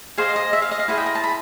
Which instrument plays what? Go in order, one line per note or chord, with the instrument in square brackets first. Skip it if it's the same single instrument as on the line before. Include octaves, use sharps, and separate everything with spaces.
[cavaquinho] G#4 C5 D#5 F5
D#5
E5
F5
D#5
F5
E4 G#4 C5 D#5 F#5
G5
A#5
A5
B5